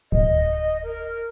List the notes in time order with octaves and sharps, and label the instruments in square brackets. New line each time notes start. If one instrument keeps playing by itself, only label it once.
[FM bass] D1 [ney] D#5
[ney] A#4